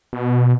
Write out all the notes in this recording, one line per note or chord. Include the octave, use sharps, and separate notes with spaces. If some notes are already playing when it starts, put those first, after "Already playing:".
B2